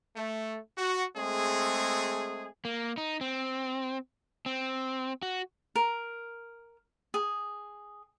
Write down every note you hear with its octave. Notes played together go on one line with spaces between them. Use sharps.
A3
F#4
G#3 A3 C4 G#4
A#3
D#4
C4
C4
F#4
A#4
G#4